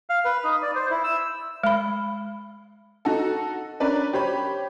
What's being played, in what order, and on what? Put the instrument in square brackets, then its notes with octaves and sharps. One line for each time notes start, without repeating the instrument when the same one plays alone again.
[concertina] F5
B4
D#4
D5
C5
E4
E6
[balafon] G#3 B5
[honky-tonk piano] D#4 F#4 A4
C#4 D4 A#4 B4 D5
G4 C5 C#5 B5